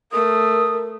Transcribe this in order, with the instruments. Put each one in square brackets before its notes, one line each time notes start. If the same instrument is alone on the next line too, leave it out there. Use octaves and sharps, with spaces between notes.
[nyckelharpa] A3 [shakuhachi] A#4 [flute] D#6